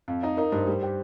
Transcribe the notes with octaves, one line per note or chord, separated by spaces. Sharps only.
F2 F5
D#4 D#5
D#4 A#4
G2 C5
G3 C5
G4